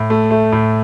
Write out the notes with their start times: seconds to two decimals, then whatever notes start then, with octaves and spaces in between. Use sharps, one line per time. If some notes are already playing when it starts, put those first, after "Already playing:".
Already playing: A2
0.10 A3
0.31 A3
0.52 A2